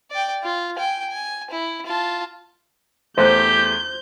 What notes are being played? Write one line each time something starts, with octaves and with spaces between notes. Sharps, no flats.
D5 G5
F4
G5 G#5
G#5
E4
F4 A5
E2 A3 G4 C5 F#6 G6